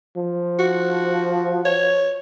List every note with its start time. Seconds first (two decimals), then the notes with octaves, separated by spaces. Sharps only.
0.17 F3
0.59 F#4
1.65 C#5